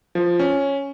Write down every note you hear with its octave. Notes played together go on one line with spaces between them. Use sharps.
F3
C#4